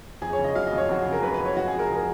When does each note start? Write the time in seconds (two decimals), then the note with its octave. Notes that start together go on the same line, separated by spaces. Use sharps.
0.22 F2 G#4
0.33 C#5
0.39 C#3
0.44 D#5
0.55 F#3 F5
0.66 D#5
0.72 F2
0.78 C#5
0.89 F2 F#4
1.02 C#3 G#4
1.13 A#4
1.23 F#3 B4
1.34 B4
1.40 F2
1.46 C#5
1.57 G#3 F#4
1.68 G#4
1.74 F2
1.79 A#4
1.87 F3 G#4
1.96 A#4